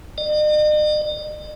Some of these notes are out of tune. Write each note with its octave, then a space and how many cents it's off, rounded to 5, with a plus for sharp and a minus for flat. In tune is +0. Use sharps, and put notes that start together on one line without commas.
D#5 -45